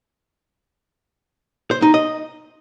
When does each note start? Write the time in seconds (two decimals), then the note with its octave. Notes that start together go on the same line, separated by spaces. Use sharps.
1.71 C5
1.82 D#4
1.94 D#5